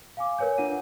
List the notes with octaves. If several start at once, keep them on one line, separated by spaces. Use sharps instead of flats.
F5 G#5 D6
A#4 B4 C#5 G#5 G6
D4 F4 F#5 D#7